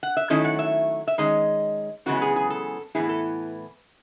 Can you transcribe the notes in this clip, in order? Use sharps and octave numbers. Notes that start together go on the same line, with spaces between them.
F#5
E5
D#3 F#3 A3 C#4 E4 D#5
F#5
E5
E5
D#3 G#3 C#4 D#5
F#2 C#3 E3 G#3 B3 F#4
G#4
G#4
A4
A2 E3 G#3 B3 E4 G#4
A4